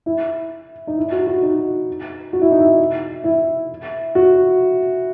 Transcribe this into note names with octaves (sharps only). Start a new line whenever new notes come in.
E4
D#4
E4
F#4
F#4
D#4
F#4
E4
D#4
E4
E4
F#4